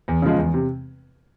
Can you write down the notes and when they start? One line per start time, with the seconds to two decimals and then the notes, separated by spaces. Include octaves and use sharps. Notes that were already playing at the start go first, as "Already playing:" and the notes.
0.08 E2
0.22 C#3 F3 G#3
0.38 E2
0.54 C3